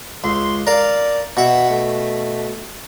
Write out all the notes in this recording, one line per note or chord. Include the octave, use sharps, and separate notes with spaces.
C#2 C6
A#4 D5 F5
B2 E5 F#5
A3